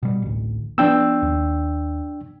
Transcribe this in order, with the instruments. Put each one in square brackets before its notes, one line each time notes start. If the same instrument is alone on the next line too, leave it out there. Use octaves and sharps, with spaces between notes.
[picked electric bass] B2 G3
A1 D2
[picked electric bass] F3 B3 [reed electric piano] D4 G5 E6
[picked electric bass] D#2